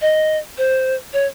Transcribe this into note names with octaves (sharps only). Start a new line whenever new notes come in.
D#5
C5
C#5